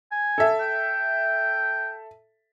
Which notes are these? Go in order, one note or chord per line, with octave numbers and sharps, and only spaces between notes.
G#5
A4 E5
G5